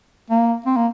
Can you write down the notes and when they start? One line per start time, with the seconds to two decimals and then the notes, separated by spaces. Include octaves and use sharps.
0.30 A#3
0.66 C4
0.76 A#3